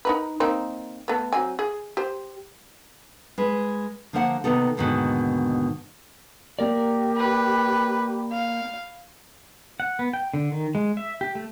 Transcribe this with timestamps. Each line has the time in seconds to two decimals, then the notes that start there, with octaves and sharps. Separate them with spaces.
0.05 D#4 A#4 B4
0.40 A#3 C4 D#4
1.08 A3 B3
1.33 F#3 C4 G#5
1.59 G#4
1.97 G4 C5
3.38 G#3 B4
4.13 D3 F3 A#3 C5 F5 F#5
4.44 C3 D#3 B3 D#4 A4
4.77 D#2 G#2 B2 D3 D#3
6.59 A#3 G4 A#4 D5
7.17 B4
8.32 F5
9.80 F#5
9.99 B3
10.13 G5
10.34 D3
10.52 D#3
10.75 G#3
10.97 E5
11.21 G4
11.35 A3